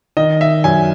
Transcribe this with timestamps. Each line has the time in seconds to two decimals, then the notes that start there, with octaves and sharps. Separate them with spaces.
0.17 D#3 D#5
0.41 E5
0.64 F#2 G#5